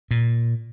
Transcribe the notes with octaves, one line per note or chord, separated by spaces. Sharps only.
A#2